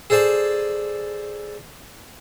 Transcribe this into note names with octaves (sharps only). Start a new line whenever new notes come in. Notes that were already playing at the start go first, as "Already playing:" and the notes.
G#4 A4 C5 D5 G#5